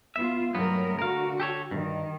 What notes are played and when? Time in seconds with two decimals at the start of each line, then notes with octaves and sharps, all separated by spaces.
0.16 B3 F4 E5
0.55 G2 F#3 A3 B3 A#4
0.99 D3 F#4 A#4 F5
1.40 G4 A4 C#5
1.71 G2 D#3